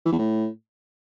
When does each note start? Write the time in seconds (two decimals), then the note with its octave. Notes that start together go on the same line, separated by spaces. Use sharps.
0.06 E3
0.12 E2
0.19 A2